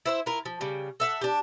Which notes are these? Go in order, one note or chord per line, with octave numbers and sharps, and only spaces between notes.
E4 C5 E5
E4 F4 A#4
F3
C#3 G3
A4 E5 F#5
D4 G4